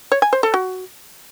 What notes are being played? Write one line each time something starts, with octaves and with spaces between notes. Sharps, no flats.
C#5
G#5
C5
A4
F#4